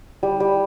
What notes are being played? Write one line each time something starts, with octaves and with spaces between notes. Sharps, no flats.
G3
G3